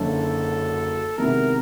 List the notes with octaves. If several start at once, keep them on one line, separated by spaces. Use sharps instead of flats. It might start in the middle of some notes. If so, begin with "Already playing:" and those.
Already playing: F#1 F#2 D3 F#3 A4
C3 D#3 G#3 B3 E4 A#4